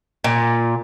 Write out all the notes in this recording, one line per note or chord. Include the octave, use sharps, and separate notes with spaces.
A#2